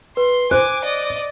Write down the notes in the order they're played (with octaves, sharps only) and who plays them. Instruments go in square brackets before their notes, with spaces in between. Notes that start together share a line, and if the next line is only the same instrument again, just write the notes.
[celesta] B4 [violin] C6
[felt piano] C5 [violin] G#5 D6 [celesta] F#6
[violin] D5 D#5